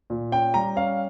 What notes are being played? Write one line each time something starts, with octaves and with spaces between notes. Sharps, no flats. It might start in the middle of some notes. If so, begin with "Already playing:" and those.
A#2
C#4 G5
G3 A#5
C#4 F5